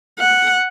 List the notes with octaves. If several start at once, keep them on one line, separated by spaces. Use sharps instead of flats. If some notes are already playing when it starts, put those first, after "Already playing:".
F#5